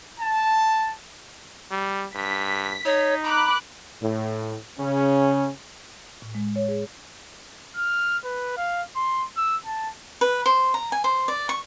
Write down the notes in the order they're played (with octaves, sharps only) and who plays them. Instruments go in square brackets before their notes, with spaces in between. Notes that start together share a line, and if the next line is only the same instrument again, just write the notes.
[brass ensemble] A5
[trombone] G3
[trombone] G2 [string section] B6
[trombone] D#4 [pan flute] C#5
[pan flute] A#5 [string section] B5 D6 F#6
[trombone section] A2
C#3 C#4
[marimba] A2
G#3
C#5
G#4
[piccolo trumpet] F6
B4
F5
C6
E6
A5
[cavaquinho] B4
C5
A#5
G#5
C5
D5
C#6